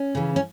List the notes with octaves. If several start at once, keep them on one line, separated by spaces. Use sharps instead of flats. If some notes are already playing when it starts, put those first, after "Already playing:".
Already playing: C#4
C#3 E3
C#4